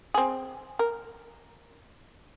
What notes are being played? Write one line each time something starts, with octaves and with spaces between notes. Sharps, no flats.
C4 G#4
A#4